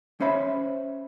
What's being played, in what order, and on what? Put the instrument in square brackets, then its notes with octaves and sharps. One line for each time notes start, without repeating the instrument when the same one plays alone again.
[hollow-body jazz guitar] C#4 C5 E5 B5